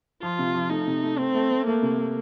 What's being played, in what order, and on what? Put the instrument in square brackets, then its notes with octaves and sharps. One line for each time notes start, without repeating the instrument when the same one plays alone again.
[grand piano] F3 [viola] F4
[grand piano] C3
F3
[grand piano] A3 [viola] D#4
[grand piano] C3
A3
[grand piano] A3 [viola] C4
[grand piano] A3
A3
[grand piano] A3 [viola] A#3
[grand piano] C3
A3